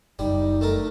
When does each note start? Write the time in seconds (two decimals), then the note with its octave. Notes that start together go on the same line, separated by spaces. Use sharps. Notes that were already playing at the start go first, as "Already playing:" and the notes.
0.19 F#1 G3 D#4
0.61 A3 A4 A#4